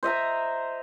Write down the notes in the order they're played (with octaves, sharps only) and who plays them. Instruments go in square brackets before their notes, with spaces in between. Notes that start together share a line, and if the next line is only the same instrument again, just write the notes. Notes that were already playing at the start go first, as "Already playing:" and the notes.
[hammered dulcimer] C5 D#5 E5 A#5